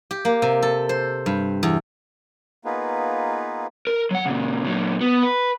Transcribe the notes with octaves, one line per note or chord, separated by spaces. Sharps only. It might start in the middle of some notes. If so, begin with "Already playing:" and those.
G4
A#3
C3
A4
C5
G2
E2
A#3 B3 D#4 F4 G#4 B4
A#4
F#3 F#5
A#2 C#3
A#2 F#3
B3
B4